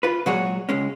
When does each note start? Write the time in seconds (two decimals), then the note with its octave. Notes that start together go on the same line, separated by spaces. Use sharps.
0.03 F4 B4
0.26 A#2 F#3 G#3 F#4 G#4 C#5
0.69 C#2 G#3 C#4